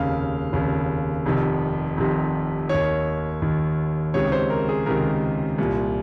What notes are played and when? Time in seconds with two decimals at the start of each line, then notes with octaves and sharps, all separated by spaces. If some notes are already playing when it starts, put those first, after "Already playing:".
Already playing: F1 D#2 C#3 F5
0.53 F1 D#2 C#3
1.26 F1 F2 C3 D#3
1.97 F1 F2 C3 D#3
2.69 D#2 D#3 C#5
3.42 D#2 D#3
4.14 C#2 C3 D#3 C#5
4.32 C5
4.50 A#4
4.69 G#4
4.86 C#2 C3 D#3 A#4
5.58 C2 A#2